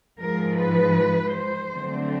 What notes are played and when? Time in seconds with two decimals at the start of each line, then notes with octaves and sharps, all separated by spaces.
0.20 G#2 F3 G#3 A#4
0.57 B4
1.34 C5
1.71 D3 F#3 A3 C4